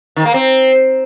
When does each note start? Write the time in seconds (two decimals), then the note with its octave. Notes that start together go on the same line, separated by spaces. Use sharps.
0.16 D#3
0.25 A#3
0.34 C4